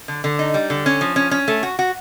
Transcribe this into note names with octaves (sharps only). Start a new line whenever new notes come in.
D3
D3
D#4
G3
D3
C#4
F3
C#4
C#4
A3
F#4
F#4